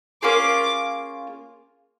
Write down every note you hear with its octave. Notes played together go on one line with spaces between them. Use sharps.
A#3 C#4 F4 G#4 D6